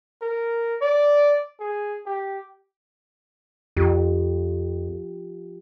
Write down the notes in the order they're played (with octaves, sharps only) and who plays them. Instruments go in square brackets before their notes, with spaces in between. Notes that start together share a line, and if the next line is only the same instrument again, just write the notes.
[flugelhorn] A#4
D5
G#4
G4
[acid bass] F2 [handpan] F3 F4 G4